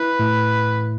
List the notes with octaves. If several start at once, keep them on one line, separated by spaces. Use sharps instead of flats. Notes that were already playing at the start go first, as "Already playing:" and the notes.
Already playing: E4 B4
A2